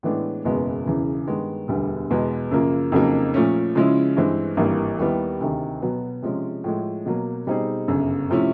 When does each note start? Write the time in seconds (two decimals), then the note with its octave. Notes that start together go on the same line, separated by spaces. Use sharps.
0.03 A2 E3 G#3 B3 D4
0.45 F#1 E2 B2 G#3 B3
0.86 E1 E2 C#3 E3
1.27 G2 D#3 G#3 B3
1.68 E1 D2 D3 G3 B3
2.10 E2 B2 G#3 B3
2.51 F#2 C#3 F3 A#3
2.92 F2 C#3 F#3 A#3 D#4
3.34 A#2 F3 A3 C#4
3.75 C#3 F3 G#3 C#4 E4
4.17 G2 E3 G#3 C4
4.57 G#1 G2 E3 G3 A#3
4.99 D#2 D#3 G3 B3 E4
5.40 D2 C3 D#3
5.82 B2 F#3 B3
6.22 C3 F3 G#3 C#4
6.64 A2 F3 G#3
7.06 B2 F#3 A#3
7.47 B2 G3 C4 D#4 G#4
7.88 G1 F#2 C#3
8.30 C3 F3 A3 C#4 E4